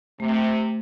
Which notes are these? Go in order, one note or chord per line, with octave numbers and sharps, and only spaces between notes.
C3 A3